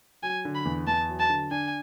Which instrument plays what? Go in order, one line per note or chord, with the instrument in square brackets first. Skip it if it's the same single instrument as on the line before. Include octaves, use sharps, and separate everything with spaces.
[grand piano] F#3 [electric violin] G#5
[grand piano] D3
[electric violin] B5
[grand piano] E2
[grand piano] E2 [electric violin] A5
[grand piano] F#3
[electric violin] A5
[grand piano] D3
[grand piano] D4 [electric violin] G#5